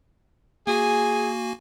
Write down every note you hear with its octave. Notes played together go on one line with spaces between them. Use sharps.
A#3 F#4 G#4 G#5